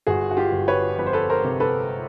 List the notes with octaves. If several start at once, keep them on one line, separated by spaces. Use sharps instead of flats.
G1 F#4 G#4
F#4
F4 G4
G1
B4 C#5
F2 B4
C5
A4 B4
A#4 C5
C3
A4 B4